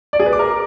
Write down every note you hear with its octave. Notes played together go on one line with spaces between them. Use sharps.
D5
G#4
B4
D6
A#4